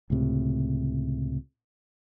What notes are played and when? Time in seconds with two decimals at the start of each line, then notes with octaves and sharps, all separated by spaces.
0.10 C#2 A2 C3